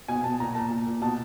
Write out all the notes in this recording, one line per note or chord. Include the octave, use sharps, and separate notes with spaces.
B2 G#5
B2 A5
A#2 A#5
A#2 A5
A#2
A#2
B2 A5